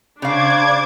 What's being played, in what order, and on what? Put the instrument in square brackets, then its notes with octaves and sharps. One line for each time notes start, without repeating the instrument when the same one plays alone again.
[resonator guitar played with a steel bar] C#3 F5 [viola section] D4 C5 D5 [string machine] D6 G#6